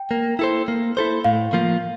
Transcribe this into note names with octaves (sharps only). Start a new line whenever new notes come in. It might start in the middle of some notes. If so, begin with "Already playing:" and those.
Already playing: G5
A#3
E4 A4 C5
A#3
E4 A4 C5
A2 F5
F3 A#3 F4